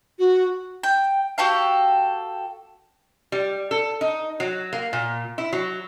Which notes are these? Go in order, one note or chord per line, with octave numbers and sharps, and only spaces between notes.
F#4
G5
F#4 G4 A4 F5
G3
A4
D#4
F#3
A#3
A#2
E4
F#3